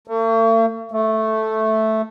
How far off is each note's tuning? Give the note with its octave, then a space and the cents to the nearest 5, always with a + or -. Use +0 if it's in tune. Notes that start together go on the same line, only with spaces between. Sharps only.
A3 +45
A3 -5